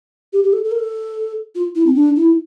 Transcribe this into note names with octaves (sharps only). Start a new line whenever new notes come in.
G4
G4
A4
A4
A#4
A4
F4
E4
C4
D4
E4